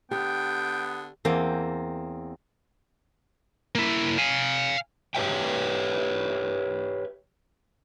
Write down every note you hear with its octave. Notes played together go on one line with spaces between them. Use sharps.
D3 B3 G4 G5
E2 A#3 C4 G5 G#5
A#3 E4
F5 G#5
G4 B4 C#5 E5 G5